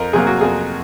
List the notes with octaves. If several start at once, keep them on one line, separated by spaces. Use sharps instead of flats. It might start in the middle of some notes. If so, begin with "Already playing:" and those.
Already playing: F2 A#4
C3 F#3 A#3 G#4
F#4
F2 G#4